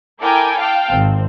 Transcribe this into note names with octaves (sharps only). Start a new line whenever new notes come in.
E4 A4 A#4 G5 G#5 D6
F5 G5 A5
G#1 C4